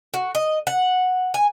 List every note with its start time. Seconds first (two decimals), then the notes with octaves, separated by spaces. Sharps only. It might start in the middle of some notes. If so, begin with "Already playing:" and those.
0.14 F#4
0.35 D#5
0.67 F#5
1.34 G#5